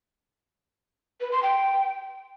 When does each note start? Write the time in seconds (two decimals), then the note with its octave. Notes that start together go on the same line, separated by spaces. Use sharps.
1.21 B4
1.32 C6
1.43 G5